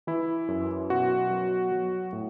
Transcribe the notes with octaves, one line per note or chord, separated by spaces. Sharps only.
E3 E4
F#2
B2 F#4
F#3
F#3
A2